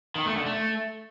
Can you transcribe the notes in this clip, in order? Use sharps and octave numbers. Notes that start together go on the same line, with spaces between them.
D#3
A3
D3
A3